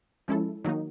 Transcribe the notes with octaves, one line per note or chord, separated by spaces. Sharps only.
F3 G#3 C#4 E4 A4
D#3 F#3 A#3 D#4